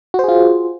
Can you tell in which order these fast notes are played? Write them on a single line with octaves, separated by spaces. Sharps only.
F#4 C5 G#4 F4